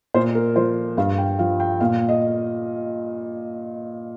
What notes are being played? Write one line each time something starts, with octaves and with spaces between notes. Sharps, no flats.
A#2 C5
A#4
F3 C5
G2 F5
G5
F3 F5
G5
A#2 F5
D#5